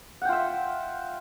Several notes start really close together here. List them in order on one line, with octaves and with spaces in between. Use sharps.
F#5 G5 F4 E5